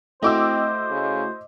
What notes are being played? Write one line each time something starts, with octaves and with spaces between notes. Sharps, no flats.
A3 C4 E4 F#4 C5 D#5 D6 E6
C#3